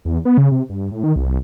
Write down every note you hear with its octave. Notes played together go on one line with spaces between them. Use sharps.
E2
B3
C#3
C3
G2
A2
D#3
C2